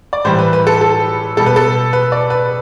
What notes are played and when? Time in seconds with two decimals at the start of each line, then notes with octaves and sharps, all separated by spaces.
0.13 D5
0.25 A2 E3 G3 C5
0.39 B4
0.53 B4
0.67 A4
0.81 A4
1.37 B2 G3 A4
1.46 B4
1.56 A4
1.93 B4
2.12 D5
2.30 B4